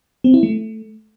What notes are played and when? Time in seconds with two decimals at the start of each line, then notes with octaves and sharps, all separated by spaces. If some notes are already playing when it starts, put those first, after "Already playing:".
0.24 C4
0.34 E4
0.43 A3